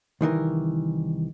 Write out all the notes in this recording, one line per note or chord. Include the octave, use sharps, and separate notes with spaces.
C2 D#3 E3 A#4